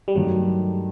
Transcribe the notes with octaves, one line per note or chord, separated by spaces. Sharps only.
G3
G2 D#3 F#3 A3